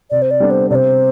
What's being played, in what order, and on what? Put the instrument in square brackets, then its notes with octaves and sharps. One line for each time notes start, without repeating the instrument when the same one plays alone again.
[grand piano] C3 [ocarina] D5
[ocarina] C5
D5
[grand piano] G3 B3 D4 A4
[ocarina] C5
[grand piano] C3 [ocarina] C5 D5